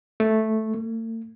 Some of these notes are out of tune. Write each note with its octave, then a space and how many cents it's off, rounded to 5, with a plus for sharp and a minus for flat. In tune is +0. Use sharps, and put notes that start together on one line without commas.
A3 -5
A3 +45